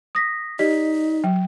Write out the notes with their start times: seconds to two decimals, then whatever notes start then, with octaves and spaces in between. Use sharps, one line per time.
0.15 D#6 A#6 B6
0.59 D#4 G4 D5 D#5 B6
1.24 F#3 G5